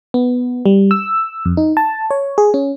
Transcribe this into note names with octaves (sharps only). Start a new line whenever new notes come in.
B3
G3
E6
F2
D#4
A5
C#5
G#4
C#4